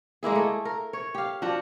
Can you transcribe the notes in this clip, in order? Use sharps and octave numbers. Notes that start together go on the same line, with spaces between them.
G#3 A#3 E4 G#4
A3
A#4
C#5
G4 F5
F3 D4 F#4